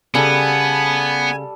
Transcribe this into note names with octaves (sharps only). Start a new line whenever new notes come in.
C#3 G3 B3 A4 G#5